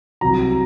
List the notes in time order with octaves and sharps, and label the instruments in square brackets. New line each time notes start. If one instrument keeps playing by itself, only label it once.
[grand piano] C2 C3 F#3 A#5